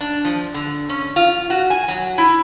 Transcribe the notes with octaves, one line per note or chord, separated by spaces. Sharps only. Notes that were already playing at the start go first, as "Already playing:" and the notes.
D4
F3
D3
C#4
F4
F#4
G#5
F#3
E4